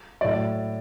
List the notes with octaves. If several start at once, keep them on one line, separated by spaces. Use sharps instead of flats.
A2 F#3 D5